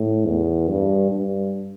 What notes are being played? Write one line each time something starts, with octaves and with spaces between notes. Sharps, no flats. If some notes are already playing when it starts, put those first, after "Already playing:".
Already playing: A2
E2
G2
G2